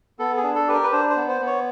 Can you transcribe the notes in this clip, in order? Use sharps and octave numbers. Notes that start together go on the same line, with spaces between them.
B3 A4
G#4
D4
A4
G4 B4
A#4
B4
D4 C5
C5
B3
C5
B3
C#5